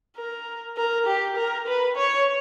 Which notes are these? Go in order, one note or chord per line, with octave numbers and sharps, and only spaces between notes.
A#4
A#4
G4
A#4
B4
C#5